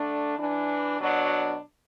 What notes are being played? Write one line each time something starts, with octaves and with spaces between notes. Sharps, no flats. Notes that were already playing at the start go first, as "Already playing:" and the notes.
Already playing: D3 A3 D4
E3 D4
B2 F#3 D4